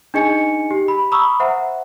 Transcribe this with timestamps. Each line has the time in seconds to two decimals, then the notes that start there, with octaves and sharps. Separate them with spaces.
0.14 D4 D#4 G#4 D#5 G#5 C#7
0.71 G4
0.88 B5
1.12 A#5 B5 C#6 D#6 E6
1.40 C5 E5 F#5 A#5